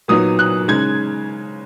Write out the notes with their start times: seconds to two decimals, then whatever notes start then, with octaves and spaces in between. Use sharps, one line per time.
0.08 A#2 F#3 B3 D#4 D#6
0.39 F#6
0.68 C#3 G#3 D#4 G#6